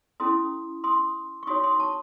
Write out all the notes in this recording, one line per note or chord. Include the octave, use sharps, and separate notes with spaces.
C#4 E4 A4 C6 D#6
C6 D#6
C#6
D#4 F#4 C#5 C6 D#6
C6 D#6
A5 C#6